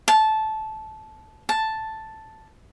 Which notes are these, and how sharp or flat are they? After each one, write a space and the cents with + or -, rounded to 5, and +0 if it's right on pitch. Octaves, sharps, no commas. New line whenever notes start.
A5 -15
A5 +0